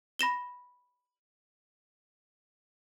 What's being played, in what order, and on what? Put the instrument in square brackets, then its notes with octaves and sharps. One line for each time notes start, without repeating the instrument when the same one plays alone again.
[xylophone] B5 A#6 E7 G7